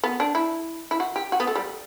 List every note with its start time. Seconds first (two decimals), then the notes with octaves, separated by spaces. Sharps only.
0.04 B3
0.20 D4
0.35 E4
0.91 E4
1.00 F#4
1.16 G4
1.32 F#4
1.40 B3
1.47 A3
1.55 G3